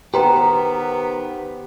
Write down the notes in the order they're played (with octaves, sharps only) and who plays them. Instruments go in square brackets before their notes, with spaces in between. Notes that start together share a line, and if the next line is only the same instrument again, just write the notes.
[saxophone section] D#3 B3 [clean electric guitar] G4 B4 C5 [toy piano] G5 A#5